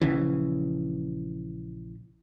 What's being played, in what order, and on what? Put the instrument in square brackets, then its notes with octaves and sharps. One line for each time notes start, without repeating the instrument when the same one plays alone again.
[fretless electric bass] A#1 C#3 E3